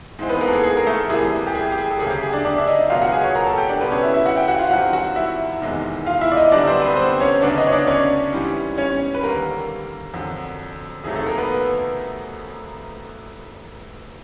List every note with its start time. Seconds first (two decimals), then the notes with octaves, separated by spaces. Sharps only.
0.19 G#2 E3 G#3 C4
0.29 B3 B4
0.41 A#3 A#4
0.48 A4
0.52 G#4
0.63 G#4
0.77 A#4
0.86 A3 A4
1.09 C2 C3 E3 G3 A#3 G#4
1.47 G4
1.55 G#4
1.72 G4
1.78 G#4
1.90 A4
1.99 D2 C#3 F#3 A#3 G#4
2.10 G4
2.23 G#4
2.33 D4 D5
2.45 D4 D5
2.58 E5
2.67 D#4 D#5
2.90 C#2 B2 F#3 B3 D#4 F4 F5
3.01 F#4 F#5
3.12 G#4 G#5
3.24 C#5 C#6
3.35 A#4 A#5
3.47 A4 A5
3.57 G4 G5
3.69 D4 D5
3.81 C#2 B2 G3 B3 B4
3.91 C#4 C#5
4.03 E4 E5
4.14 E4 E5
4.26 F#4 F#5
4.36 G4 G5
4.48 F#4 F#5
4.59 F4 F5
4.71 F#2 D#3 G3 C4 F4 F#4 F#5
4.93 F#4 F#5
5.16 E4 E5
5.62 F1 E2 C3 D#3 G#3
6.06 F4 F5
6.21 E4 E5
6.32 D5
6.37 D#4 D#5
6.52 F#2 D3 G3 B3 D4 D5
6.67 C4 C5
6.81 B3 B4
6.97 C4 C5
7.20 C#4 C#5
7.42 D2 C#3 F#3 B3 D4 D5
7.58 D#4 D#5
7.67 C#5
7.73 D4 D5
7.87 C#4 C#5
8.33 G#2 E3 G3
8.78 C#4 C#5
9.15 B4
9.23 D#2 D3 G3 A#3 A#4
10.14 F2 D3 F#3
11.04 F2 C3 D#3 F#3 A3 G#4
11.15 A3 A4
11.26 A#3 A#4
11.38 B3 B4